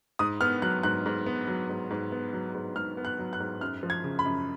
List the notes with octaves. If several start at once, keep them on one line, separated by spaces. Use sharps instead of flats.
G#2 D#6
B3 F6
F#3 F#6
G#2 F#6
G#2
B3
F#3
G#2
G#2
B3
F#3
G#2
G#2 F6
B3
F#6
F#3
F#6
G#2
F#2 F6
F3
G#6
C#3
B5
F#2